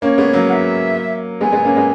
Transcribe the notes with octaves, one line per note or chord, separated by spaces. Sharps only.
A#3 C#4 C#5
G#3 B3
F#3 A#3
F#5
E5
G#3 B3 G#5
G#3 B3
A#3 C#4
G#3 B3